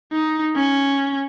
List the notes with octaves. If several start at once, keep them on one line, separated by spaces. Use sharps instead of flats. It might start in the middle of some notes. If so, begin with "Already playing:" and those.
D#4
C#4